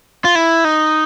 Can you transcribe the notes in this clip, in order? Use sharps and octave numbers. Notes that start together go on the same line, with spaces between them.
F4
E4
D#4